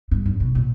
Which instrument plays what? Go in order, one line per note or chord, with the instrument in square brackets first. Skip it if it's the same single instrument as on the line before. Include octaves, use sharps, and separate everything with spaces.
[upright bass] G2
F#2
B2
A#2